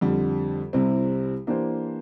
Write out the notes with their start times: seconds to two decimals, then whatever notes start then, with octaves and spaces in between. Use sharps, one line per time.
0.01 F2 D3 G3
0.73 C2 C3 G3 C4 E4
1.47 E3 A#3 D4 G4 C5